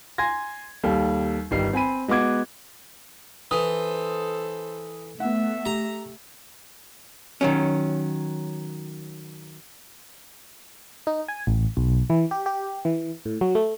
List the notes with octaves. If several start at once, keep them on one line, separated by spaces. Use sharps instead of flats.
G#5 C6 G#6 A#6
D#2 G3 A4
G1 D#3 G3 C7
C4 G#5 B5 D#7
G#3 B3 F#4 D6 G#6
E3 A4 C5 D#6
A3 B3 E5 F#5
G4 A#5
D#3 F#3 C#4
D#4
G#5
A1
B1
E3
G4
G4
E3
A2
F#3
A3